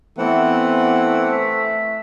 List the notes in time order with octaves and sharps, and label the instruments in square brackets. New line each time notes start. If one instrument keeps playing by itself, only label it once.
[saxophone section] E3 [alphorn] A3 [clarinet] B3 [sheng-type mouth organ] C4 F#5
[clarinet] E5